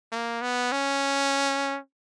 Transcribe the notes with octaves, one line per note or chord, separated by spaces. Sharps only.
A#3
B3
C#4